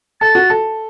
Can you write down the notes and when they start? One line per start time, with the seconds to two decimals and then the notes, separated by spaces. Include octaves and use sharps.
0.21 A4 A6
0.35 F#4
0.50 A4